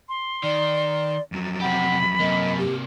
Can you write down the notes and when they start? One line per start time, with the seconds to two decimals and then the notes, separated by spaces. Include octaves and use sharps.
0.09 C6
0.43 D#3 D5
1.32 F2 F#3
1.61 C3 G4 F#5 B5
2.20 F#2 C3 A#3 D#5
2.58 G4